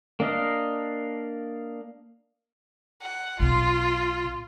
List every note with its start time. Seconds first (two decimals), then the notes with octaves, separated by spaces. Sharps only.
0.20 A#3 D4 D#5 F5
3.02 F#5
3.40 B1 B2 F4